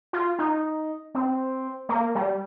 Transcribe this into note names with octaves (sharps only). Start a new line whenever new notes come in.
F4
D#4
C4
A#3
G3